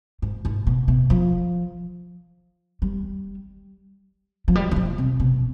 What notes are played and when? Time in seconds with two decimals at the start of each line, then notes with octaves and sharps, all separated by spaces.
0.22 G#2
0.45 G#2
0.67 B2
0.88 B2
1.10 F3
2.82 G3
4.48 F3
4.55 G3
4.71 D#3
4.76 F3
4.98 C3
5.20 B2